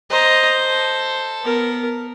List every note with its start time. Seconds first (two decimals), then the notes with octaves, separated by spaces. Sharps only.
0.11 C5 D#5 A#5
0.65 A4
1.42 B3 A#4